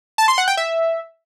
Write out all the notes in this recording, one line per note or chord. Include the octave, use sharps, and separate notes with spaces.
A5
C6
F#5
G5
E5